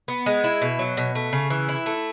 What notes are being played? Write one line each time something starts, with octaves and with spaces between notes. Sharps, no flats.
B3
G#3
E4
B2
F#3
B2
A3
C#3
E3
E4
A3